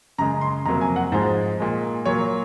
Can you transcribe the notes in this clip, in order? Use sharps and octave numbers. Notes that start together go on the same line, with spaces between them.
F#2 C#3 G#3 A#5
C6
F2 C3 F#3 A#3 A#5
G#5
F#5
G#2 F3 G#3 C5
A#2 G#3
A#2 F#3 A#3 C#5